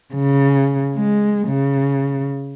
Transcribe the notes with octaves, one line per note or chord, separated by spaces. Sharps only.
C#3
G#3
C#3